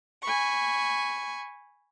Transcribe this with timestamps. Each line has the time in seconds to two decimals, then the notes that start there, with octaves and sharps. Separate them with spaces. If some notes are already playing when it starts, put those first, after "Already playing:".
0.22 G#5 B5 C#6